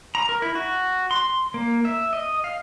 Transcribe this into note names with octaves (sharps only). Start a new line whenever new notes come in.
A#5
A#4
E4
F#4
C6
A#3
E5
D#5
F5